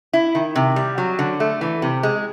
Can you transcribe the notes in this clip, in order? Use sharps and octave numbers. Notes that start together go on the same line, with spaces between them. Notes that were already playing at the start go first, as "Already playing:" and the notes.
E4
D#3
C3
G3
F#3
D3
A3
E3
C3
G#3